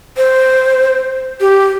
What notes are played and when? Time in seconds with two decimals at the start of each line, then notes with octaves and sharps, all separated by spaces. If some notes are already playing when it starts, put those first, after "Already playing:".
0.17 C5
1.41 G4